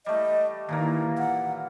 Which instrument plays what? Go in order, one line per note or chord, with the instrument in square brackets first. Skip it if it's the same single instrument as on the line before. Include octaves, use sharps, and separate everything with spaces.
[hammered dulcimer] G3 A3 [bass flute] D#5
[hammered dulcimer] A#2 E3 A#3 [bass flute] D#3
[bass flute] F#5